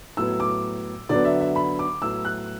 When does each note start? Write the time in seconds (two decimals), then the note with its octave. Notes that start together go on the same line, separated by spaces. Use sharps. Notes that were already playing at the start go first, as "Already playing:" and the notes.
0.17 A2 F#3 B3 E6
0.40 D6
1.09 D3 F#3 B3 D5
1.25 E5
1.41 E5
1.56 B5
1.79 D6
2.02 A2 F#3 B3 E6
2.25 F#6